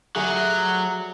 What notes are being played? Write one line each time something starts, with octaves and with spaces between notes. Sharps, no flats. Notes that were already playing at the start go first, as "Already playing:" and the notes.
F#3 G3 A3 G#4